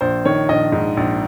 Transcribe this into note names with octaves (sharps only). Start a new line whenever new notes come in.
A#1 C5
D#3 C#5
A#1 D#5
G#2
A#1